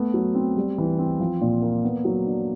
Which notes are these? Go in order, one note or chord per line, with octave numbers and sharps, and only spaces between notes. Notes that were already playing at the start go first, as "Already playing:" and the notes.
Already playing: A3 B3
F#3
C4
G3
E3
C4
F3
A#2
A#3
B3
F#3
D4